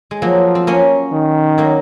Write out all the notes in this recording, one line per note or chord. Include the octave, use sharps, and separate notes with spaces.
G#3
F3 F#3 A#3
C4
A#3 C#4
D#3
F#3 A#3